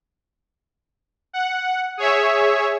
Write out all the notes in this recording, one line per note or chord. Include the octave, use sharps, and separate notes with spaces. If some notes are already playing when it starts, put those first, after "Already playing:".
F#5
G#4 C#5 E5